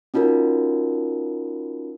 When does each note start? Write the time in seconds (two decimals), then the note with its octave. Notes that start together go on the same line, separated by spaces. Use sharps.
0.14 C#4 D#4 F4 F#4 A#4